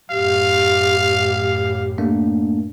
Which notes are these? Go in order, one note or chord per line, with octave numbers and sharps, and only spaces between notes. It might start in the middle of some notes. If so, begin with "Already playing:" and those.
F#2 A2 G4 F5
A3 A#3 D4